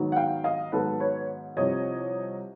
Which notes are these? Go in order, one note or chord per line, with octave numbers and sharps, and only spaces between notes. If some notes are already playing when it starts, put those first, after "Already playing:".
Already playing: G#2 D#3 F#3 B3
F#5
F5 G5
D#5 F5
G#2 D#3 F#3 B3 A4 B4
B4 C#5
C2 C3 F3 C#5 D#5